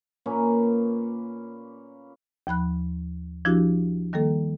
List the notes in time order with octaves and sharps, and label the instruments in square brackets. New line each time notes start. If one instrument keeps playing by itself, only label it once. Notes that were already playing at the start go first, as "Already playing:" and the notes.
[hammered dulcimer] A#2 A#3 C#4 B4
[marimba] D#2 F3 B5 F#6
F3 D4 E4 F#4 G4
D#3 G3 A#3 A4